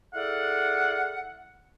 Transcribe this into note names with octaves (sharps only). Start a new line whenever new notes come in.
E4 G#4 A4 D5 F5 F#5